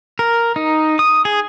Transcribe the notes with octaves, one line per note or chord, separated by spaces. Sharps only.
A#4
D#4
D#6
G#4